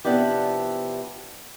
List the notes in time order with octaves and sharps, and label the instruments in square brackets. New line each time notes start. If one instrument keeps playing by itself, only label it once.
[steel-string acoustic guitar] C3 F3 B3 D4 E4 G4